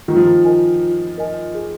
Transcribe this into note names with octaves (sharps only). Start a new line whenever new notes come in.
D#3 F4
F3
D#3
A#4 D#5 G#5
F4
A#4 D#5 G#5
G#4